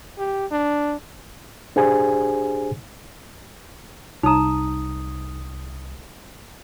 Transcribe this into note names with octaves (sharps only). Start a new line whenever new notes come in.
G4
D4
D4 G4 G#4 C5 G#5
C2 D#4 A#5 D#6